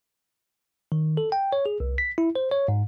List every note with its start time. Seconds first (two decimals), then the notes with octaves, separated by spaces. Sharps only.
0.92 D#3
1.17 A4
1.32 G5
1.53 C#5
1.66 G#4
1.80 C2
1.98 B6
2.18 E4
2.35 C5
2.51 C#5
2.68 G#2